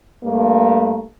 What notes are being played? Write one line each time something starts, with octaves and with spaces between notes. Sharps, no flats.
G2 A3 A#3